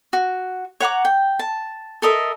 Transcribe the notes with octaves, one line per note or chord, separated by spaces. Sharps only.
F#4
C#5 F#5 A#5 D6
G5
A5
A4 A#4 D#5 E5